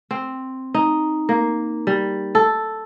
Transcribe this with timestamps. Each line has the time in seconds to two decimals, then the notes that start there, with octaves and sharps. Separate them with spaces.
0.11 C4
0.74 D#4
1.29 A#3
1.87 G3
2.35 A4